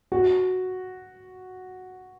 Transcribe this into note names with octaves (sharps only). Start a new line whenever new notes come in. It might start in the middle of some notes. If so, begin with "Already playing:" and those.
F#4